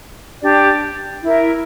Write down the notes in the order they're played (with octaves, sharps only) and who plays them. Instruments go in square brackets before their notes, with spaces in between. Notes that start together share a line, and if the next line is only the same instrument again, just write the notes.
[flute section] D4 G4 D5
E4 A#4 E5